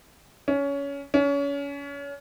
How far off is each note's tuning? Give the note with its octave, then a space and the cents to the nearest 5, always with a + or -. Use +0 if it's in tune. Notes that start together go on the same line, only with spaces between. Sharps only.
C#4 +20
C#4 +30